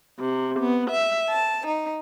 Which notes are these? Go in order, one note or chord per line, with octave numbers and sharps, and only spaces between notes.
C3
B3
E5
A5
D#4